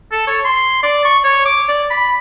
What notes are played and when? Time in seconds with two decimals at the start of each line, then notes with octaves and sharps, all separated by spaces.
0.12 A4
0.27 C#5
0.45 C6
0.83 D5
1.05 C#6
1.24 C#5
1.45 D6
1.69 D5
1.90 B5